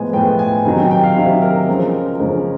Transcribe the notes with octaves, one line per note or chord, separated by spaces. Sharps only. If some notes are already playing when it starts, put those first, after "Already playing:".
Already playing: A2 F3 G#3 B3 G#5
A2 F3 G#3 B3 G5
G#5
C3 D#3 F#3 G#5
G5
G5
F5
C3 D#3 F#3 E5
A#4
C#2 C#3 F3 G#3 C#4
C#2 C#3 F3 G#3 C#4